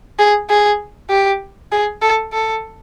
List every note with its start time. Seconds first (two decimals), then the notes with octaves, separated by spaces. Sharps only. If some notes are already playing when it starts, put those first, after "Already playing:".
0.19 G#4
0.49 G#4
1.10 G4
1.72 G#4
2.02 A4
2.33 A4